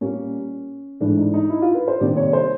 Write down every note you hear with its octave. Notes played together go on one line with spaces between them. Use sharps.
A#2 G3 A#3 C#4
G#2 E3 A3 D4
D#4
D#4
E4
F4
B4
C5
C3 D#3 G3 A#3 D5
C#5
C5